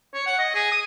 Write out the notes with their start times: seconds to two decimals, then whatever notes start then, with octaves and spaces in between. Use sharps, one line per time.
0.14 C#5
0.26 F#5
0.39 D#5
0.55 G#4
0.71 D#6